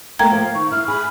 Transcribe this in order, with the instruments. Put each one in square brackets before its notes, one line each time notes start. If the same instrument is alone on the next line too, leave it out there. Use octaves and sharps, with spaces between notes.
[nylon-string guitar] A3 A#3 F#4 [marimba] G5 A#5 G#6
[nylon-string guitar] F3 A#3 [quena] F5
[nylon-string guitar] D#3 [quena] C#6
[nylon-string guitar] E4 [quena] F6
[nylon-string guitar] G#4 [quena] B5